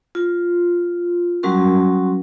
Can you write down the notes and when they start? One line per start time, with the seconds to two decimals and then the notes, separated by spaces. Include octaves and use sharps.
0.15 F4
1.43 F#3 G3 C#4 F#4 A#4 C6